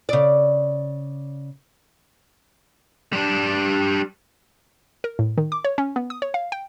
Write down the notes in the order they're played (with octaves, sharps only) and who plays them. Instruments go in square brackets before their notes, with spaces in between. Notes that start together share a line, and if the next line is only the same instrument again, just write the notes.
[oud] C#3 D5
[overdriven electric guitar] G3 D4
[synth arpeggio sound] A#4
A2
D#3
D6
C#5
C#4
B3
D#6
C#5
F5
G5